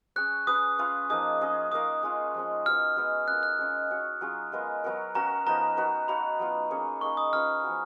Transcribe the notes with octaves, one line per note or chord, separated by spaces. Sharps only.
C#4 G#4 C#5 F#6
C#4 G#4 B4 D#6
C#4 F4 B4 F5
F3 A#3 D#4 G#4 D#6
C#4 G#4 D#5
A#3 D#4 A#4 F5 D#6
G#3 C#4 F4
F3 G#3 C#4
D#4 F#4 B4 F6
G#3 B3 F#4 B4
C#4 F4 A#4 F#6
F#6
G#3 C#4 F4
C#4 F#4 C#5
F#3 C#4 F4 G#4
G#3 B3 F4 A#4
F#3 B3 F#4 A#4
C#4 F#4 A#4 F5 A#5
F3 B3 D#4 A#4 A#5
D#4 F#4 B4
D#4 F#4 C#5 F5 B5
F#3 B3 F4
A#3 C#4 G#4 C#5
A#3 D#4 G#4 C#6
D#6
C#4 F4 G#4 B4 F6
F3 B3 F#4